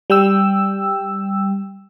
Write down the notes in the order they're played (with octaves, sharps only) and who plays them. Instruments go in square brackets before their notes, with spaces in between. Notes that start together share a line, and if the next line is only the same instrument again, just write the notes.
[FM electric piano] G3 G5 E6